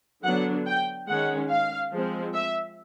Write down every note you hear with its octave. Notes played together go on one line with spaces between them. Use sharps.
D3 F#3 B3 D4 F#5
G5
D#3 G#3 C#4 F#5
F5
F3 G#3 C4
E5